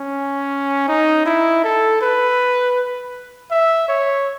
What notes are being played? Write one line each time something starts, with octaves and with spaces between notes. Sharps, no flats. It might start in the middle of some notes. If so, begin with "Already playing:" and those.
Already playing: C#4
D#4
E4
A4
B4
E5
C#5